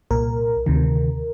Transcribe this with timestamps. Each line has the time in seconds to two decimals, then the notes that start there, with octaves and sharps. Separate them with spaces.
0.11 C2 A#2 A#4
0.66 D2 C3 D#3